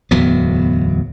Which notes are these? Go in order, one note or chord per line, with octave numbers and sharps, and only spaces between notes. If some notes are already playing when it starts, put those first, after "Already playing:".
D1 E2 F#3 B3